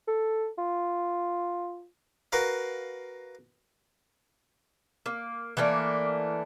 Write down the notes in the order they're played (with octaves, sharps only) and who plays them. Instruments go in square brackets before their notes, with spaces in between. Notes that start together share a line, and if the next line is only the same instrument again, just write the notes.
[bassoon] A4
F4
[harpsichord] F#4 A#4 B4 F5
[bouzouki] A#3
E3 A3 A#3 D4